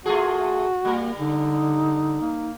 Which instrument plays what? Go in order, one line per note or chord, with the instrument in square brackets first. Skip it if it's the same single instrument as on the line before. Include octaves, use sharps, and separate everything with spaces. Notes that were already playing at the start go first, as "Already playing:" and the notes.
[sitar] A3 F4 G#4 [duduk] F#4
[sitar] G3 A#4 [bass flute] A#3
[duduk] D3 [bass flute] D#4
[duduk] A#3